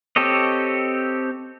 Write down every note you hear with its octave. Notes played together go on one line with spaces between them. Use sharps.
C4 G4 A4 C#5 D#5